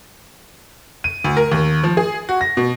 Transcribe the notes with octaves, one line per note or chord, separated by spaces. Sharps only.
D#7
D2
A#4
D#2
F3
G#4
F#4
A#6
B2